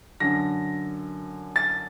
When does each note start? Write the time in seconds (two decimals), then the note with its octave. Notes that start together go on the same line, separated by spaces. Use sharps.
0.20 F#2 D3 A#6
1.56 A6